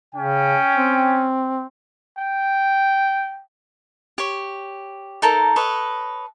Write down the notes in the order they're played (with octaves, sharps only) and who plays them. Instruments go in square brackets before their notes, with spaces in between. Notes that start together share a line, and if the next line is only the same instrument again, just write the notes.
[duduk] C#3 [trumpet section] C#4 G5
[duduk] C4
[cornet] G5
[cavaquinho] G4 C#5
D#4 A4 A#4 A5
A4 B4 C#5 D#5